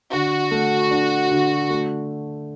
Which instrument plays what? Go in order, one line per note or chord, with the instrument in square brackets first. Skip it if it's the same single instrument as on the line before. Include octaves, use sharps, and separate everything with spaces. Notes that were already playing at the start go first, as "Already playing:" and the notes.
[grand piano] D3 [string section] F#4
[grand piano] A3
D4
D3
A3